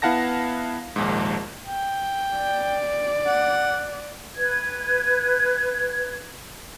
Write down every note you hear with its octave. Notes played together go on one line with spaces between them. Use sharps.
B3 E4 F5 F#5 A5 A#6
A#1 D#2 G#2
G5
D5
F#5
B4 G#6